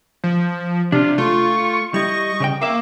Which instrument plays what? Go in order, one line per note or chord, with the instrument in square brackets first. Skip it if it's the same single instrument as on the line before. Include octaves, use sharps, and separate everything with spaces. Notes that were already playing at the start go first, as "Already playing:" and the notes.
[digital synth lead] F3
[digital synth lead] C3 [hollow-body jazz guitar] D4 [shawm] F4
[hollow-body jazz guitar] A3 [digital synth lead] F4 [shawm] C#6
[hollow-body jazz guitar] G3 E4 [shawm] D#5 [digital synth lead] C#6
[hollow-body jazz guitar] C#3 D5 G5
[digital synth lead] A#3 [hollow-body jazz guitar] E5 F5 [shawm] D6